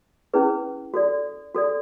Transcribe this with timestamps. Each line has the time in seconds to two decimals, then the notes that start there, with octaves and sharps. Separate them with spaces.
0.34 C#4 E4 G#4 B4
0.94 F#4 A4 D5
1.55 F#4 A4 D5